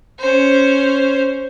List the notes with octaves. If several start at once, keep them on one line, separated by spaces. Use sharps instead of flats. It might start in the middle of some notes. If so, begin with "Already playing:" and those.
C#4 C5